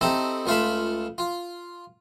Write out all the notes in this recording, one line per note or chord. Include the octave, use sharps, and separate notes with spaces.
C4 D#4 E4 G4 A4
C#2 A3 F4 F5 A5 B5
F4